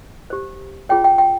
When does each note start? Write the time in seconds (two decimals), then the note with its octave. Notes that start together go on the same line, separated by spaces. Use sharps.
0.30 G4 C5
0.89 F4 G#4 C#5 G5
1.04 G5
1.18 G5